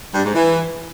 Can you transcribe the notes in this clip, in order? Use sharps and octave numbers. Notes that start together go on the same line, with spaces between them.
G2
G#2
E3